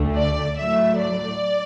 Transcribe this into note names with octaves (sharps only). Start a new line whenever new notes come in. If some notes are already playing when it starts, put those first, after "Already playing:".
Already playing: D2 D3 A3
D5
A2 F#3 A3 E5
D5